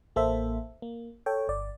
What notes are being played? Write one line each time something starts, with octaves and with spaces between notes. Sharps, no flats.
A1 A#3 A4 C5 E5
A#3
A4 C#5 G5
G1 D5